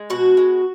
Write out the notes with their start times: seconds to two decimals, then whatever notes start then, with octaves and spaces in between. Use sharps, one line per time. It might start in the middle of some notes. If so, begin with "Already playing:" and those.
Already playing: G#3
0.10 B2 F#4
0.37 G#3